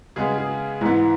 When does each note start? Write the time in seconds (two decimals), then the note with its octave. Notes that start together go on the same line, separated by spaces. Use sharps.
0.16 C#3 G#3 B3 G#4
0.38 G#4
0.81 G#2 E3 B3 E4